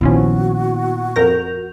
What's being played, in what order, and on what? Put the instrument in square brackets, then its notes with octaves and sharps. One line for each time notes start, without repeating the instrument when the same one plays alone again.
[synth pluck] A#1 F3 C#4 [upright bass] A#2 [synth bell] D#3 B3 E4 [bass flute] F#4
[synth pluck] F2 A#4 A#6 [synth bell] G6 F7